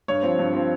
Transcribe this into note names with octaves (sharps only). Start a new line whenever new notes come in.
G2 C#5
F3 C4
G2
F3 C4